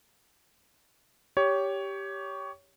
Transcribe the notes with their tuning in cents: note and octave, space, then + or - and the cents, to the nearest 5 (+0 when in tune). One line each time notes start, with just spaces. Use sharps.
G4 +0 C#5 +15